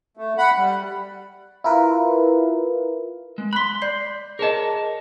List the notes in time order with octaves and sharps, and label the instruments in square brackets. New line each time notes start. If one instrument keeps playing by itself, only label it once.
[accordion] A3
F#5 B5
G3
[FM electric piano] E4 F4 A#4 B4
[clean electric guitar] G#3
[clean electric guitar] B5 C6 [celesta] F#6 B6
[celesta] D5 G6 C7
[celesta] G#4 D#5 [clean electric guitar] A#4 C#5 A5